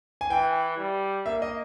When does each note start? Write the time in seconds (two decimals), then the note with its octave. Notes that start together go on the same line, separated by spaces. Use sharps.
0.21 G#5
0.30 E3 G5
0.78 G3
1.26 A#3 E5
1.42 D#5